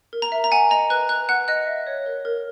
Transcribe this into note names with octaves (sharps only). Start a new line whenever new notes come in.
A#4
A#5
E5
A#5
F#5 G#5
D#5 A#5
B4 F#6
B4 F#6
F#5 F#6
D#5 F#6
E5
C#5
A#4
A#4